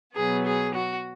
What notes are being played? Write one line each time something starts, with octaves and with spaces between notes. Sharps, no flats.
B2 F#3 B3 G#4
G#4
F#4